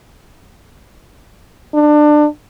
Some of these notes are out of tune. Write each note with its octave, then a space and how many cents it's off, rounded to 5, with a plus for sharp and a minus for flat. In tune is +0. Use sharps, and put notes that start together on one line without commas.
D4 +25